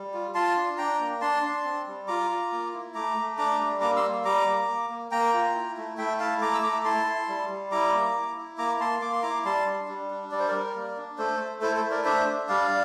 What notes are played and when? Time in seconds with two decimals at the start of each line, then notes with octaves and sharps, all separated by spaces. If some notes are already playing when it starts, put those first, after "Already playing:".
Already playing: G3
0.14 F4
0.35 F4 A5 C6
0.56 D4
0.78 D4 G5 A#5
1.00 A#3
1.21 D4 A5 C6
1.43 D4
1.65 C4
1.87 G3
2.08 F4 A#5 D6
2.30 F4
2.52 A#3
2.73 E4
2.95 A3 A#5 D6
3.17 A3
3.38 D4 A#5 D6
3.59 G3
3.81 A#3 A#5 D6
3.96 C6 E6
4.04 A#3
4.25 G3 A#5 D6
4.46 A#3
4.68 A#3
4.89 A#3
5.11 A#3 G5 A#5
5.34 F4
5.54 E4
5.77 A3
5.98 A3 E5 G5
6.19 E4 F5 A5
6.41 A3 A#5 D6
6.54 E6
6.63 A3 A#5 D6
6.85 E4 A5 C6
7.06 E4
7.29 G3
7.50 G3
7.72 E4 A#5 D6
7.93 A#3
8.15 E4
8.36 E4
8.58 A#3 A#5 D6
8.80 A#3 A5 C6
9.02 A#3 D6
9.13 C6
9.23 E4 A#5 D6
9.45 G3 A5 C6
9.66 D4
9.88 G3
10.10 D4
10.32 G3 D5
10.40 C5
10.48 A#4 D5
10.53 G3
10.75 A#3
10.97 D4
11.18 A3 A4 C5
11.41 A3
11.61 E4 A4 C5
11.76 A4 C5
11.84 A3
11.90 A#4 D5
12.05 D4 C5 E5
12.26 D4
12.48 G3 D5 F5